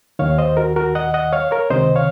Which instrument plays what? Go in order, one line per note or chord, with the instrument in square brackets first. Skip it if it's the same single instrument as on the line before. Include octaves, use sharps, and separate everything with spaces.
[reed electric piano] D#2 D#3 C#5 F5
C5 D#5
F#4 A#4
F#4 A#4
D#5 F#5
D#5 F#5
C#5 F5
A#4 C#5
C#2 C3 D#3 C5 D#5
C#5 F5